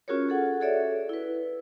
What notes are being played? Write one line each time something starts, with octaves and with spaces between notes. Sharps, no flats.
C#4 F4 F#4 G#4 A#4 C#5
G#4 A4 F#5
F#4 G#4 A4 C#5 D5 E5
E4 B4